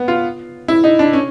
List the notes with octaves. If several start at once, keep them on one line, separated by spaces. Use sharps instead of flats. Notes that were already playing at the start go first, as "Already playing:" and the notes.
Already playing: B3
F4
E4
D#4
D4
C#4